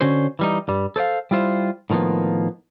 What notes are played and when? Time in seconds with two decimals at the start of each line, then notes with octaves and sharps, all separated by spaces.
0.01 D3 C#4 F#4 C5
0.39 E3 G3 D#4
0.68 G2 G3
0.96 A4 C5 D5 F5
1.31 G3 E4 F4 C5
1.90 A2 D#3 F3 A#3 B3